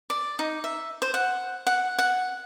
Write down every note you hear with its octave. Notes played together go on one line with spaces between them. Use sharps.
D5
D#4
E5
C5
F#5
F#5
F#5